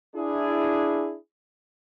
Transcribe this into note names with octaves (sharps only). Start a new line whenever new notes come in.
D4 E4 G#4